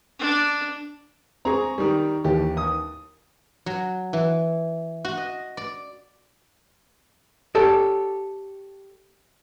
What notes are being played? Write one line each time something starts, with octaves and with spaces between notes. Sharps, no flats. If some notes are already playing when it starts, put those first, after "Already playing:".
D4
C4 G#4 A#5 C#6
D#3 G3
D#2 E3 G4
D#6
F#3
E3
F#4
D#5
D5
G4 A4 C#5 D5